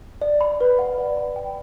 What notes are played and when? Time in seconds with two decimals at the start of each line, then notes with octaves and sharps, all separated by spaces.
0.21 D5
0.41 B5
0.61 B4
0.79 F#5
0.98 D5
1.17 B5
1.36 G5